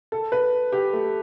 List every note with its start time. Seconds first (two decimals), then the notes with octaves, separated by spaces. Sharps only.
0.12 A4
0.32 B4
0.72 G4
0.93 A3